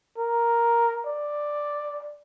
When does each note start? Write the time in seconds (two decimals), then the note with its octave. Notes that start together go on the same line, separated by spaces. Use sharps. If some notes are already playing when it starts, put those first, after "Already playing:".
0.18 A#4
1.07 D5